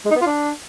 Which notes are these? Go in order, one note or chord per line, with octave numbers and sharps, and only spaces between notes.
G#3
D#4
B3
F4
D4